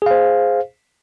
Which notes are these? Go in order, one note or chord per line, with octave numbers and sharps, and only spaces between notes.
G#4 C5 F5